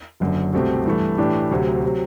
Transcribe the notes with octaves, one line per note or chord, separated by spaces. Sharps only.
F#1 F#2 D3
C2 B2 A3 C4 G4
G2 E3 A3
A2 E3 A3 D4 G4
D2 C3 F#3
C3 F#3